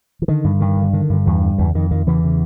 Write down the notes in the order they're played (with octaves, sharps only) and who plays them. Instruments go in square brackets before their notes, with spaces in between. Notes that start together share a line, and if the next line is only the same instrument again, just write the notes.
[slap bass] E3
D3 D#3
G2
G2 D#3
D3
D3 D#3
G2
E2 G2 E3
D3
E2 C#3 E3
F2 D#3
F2 D#3
E2 C#3 E3
C#3